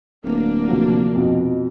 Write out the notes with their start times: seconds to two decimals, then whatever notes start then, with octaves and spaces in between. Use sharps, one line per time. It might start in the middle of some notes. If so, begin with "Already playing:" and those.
0.25 D1 A#3 D4
0.68 C3 F3 F#4
1.15 F2 B2 D#4